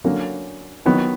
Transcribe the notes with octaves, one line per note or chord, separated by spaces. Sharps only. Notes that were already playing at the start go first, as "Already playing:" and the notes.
D3 F#3 A#3 C#4
D#3 F#3 B3